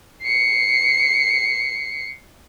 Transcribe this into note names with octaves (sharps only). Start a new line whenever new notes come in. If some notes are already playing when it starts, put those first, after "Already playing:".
C7 C#7